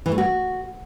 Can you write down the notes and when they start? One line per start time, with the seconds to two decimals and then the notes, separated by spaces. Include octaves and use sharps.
0.06 E3
0.12 A3
0.18 F#4